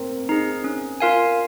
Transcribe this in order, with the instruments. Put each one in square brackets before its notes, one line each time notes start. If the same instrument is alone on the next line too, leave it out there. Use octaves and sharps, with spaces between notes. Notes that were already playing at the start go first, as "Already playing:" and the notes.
Already playing: [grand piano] A#3 C4
[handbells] D#4 G#4
C#4
F4 A#4 F5 G#5